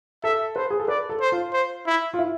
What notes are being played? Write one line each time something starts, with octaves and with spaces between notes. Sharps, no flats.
A4 E5
B4 C5
G#4
A4
B4 D5
A4
C5
F4
C5
E4
F4
E4